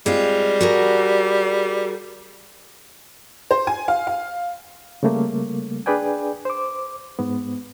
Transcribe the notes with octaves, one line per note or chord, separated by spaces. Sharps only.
G3 G#3 C4 F4
F#4 G#4 A#4
C5
G#5
F5
F5
C#3 G3 A3 A#3
D4 G#4 B4 D5 G5 G#5
C5 D6
G#2 B3